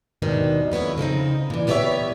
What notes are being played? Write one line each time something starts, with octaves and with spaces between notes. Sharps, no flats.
D#2 G#2 B2 D#3 D4
F2 B3 E4 C#5
C#3 F3 C4 D#4
A#2 E3
G3 B3 G4 A4 C#5 E5